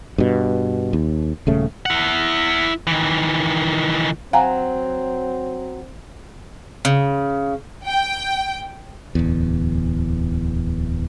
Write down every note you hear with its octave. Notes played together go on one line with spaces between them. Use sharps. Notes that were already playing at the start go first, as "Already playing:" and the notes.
G2 B2
D#2
D#1 C#3 A3
E4 F#5
D#3 E3
F#3 C4 F5 G#5 A#5
C#3
G5
D1 E2